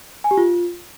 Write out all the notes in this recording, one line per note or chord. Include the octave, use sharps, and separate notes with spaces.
G#5
G4
F4